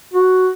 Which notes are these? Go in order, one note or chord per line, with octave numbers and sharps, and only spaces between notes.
F#4